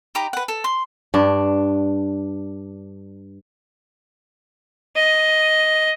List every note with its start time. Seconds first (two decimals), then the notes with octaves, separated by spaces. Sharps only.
0.15 D#4 G4 A#5 B5
0.33 B4 F#5
0.48 A4
0.64 C6
1.14 G2 D4
4.96 D#5